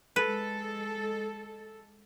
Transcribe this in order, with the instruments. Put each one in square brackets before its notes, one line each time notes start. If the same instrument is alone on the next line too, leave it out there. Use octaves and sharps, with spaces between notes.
[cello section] G#3 A4 [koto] B4